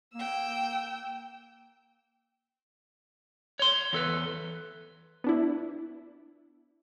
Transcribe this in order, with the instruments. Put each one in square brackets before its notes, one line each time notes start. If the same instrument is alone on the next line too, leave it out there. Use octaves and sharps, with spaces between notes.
[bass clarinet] A#3 [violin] G5 E6
[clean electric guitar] C#5 C6
E2 A4 B4
[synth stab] B3 D4 E4